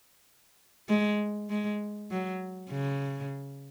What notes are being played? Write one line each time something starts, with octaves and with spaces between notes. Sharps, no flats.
G#3
G#3
F#3
C#3